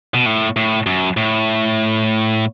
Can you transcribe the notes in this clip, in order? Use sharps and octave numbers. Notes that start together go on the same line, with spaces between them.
B2
A2
A2
F#2
A2